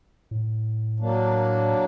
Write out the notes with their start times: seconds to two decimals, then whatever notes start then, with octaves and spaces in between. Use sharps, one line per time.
0.31 A2
1.00 F#3 A#3 D4